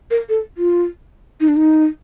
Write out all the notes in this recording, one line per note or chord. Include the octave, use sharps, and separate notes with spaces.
A#4
A4
F4
D#4
D4
D#4